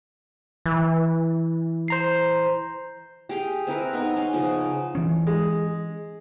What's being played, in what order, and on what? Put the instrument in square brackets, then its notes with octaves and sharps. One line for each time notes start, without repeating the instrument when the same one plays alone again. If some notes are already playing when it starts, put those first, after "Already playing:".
[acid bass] E3
[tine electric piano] C5 A#5 C7
[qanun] G4 G#4 F5 G5
C4 E4 A#4 B4
B3 D#4 A#4
B3 C#4 F5
C#3 F3
[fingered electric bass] E3 C#4
[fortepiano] G#3